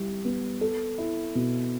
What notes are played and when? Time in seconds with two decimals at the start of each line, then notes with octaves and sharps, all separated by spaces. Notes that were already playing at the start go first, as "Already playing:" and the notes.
Already playing: G3 E4
0.25 B3
0.61 A4
0.98 E4
1.35 B2